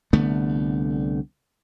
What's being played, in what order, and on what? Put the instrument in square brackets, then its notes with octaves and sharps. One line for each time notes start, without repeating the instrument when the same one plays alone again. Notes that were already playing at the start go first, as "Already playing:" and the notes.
[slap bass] C2 D3 A3 B3